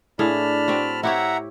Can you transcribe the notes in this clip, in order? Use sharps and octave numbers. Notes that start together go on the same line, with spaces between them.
A2 D4 G#4 F5 A5 B5 F6
C4 F#4
E4 G4 C#5 E5 F#5 A#5